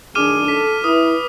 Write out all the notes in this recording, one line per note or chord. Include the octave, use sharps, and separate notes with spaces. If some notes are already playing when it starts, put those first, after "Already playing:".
F#2 A2 D#3 D4 G#4 D6 F6 D#7
A4 B6
E4 B4 D#6